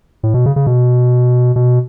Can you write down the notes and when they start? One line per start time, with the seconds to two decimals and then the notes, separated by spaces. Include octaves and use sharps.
0.23 A2
0.34 B2
0.46 C#3
0.56 C#3
0.67 B2
1.56 B2